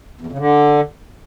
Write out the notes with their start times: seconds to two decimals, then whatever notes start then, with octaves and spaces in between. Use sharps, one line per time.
0.21 E2
0.27 F2
0.32 C#3
0.38 D3